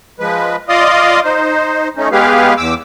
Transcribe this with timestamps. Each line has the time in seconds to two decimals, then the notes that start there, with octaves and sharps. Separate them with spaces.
0.20 F3 G#3 B4
0.69 F4 D5 D#5 F5 C6 D#6
1.24 D#4 C5
1.97 A3 C#4 D#4
2.12 G#3 B3 G4 G#4 B4 F5
2.57 E2 D6 E6